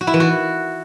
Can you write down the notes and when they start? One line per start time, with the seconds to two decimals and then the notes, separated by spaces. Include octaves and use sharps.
0.01 F#4
0.07 E4
0.14 E3
0.20 F#4